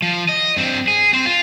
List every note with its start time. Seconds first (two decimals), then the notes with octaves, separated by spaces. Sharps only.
0.02 F3
0.29 D#5
0.56 G2 C4
0.88 G#4
1.13 C4 C5
1.26 F4